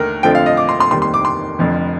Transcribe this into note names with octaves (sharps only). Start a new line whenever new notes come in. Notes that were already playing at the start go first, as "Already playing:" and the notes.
Already playing: D#2 D3 A3 A#4
F2 D3 F3 A3 C4 G5
F5
D#5
D6
C6
C6
F1 D#2 D#3 G3 C6
C6
D6
C6
F1 F2 D3 F3